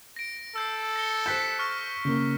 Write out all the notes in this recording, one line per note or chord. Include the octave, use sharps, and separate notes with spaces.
A#6 D7
A4 E6 G6 C7
A#6 C#7 G7
C5 F#6 G6 B6 E7
C#6 F6 A#6
C#3 A#3